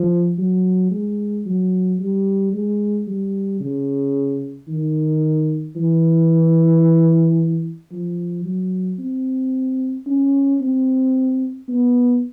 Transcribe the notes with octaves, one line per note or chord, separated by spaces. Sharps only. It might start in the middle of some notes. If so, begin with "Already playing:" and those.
Already playing: F3
F#3
G#3
F#3
G3
G#3
G3
C#3
D#3
E3
F3
F#3
C4
C#4
C4
B3